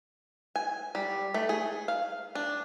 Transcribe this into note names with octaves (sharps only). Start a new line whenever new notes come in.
G#5
G3
A3
G#4
F5
D4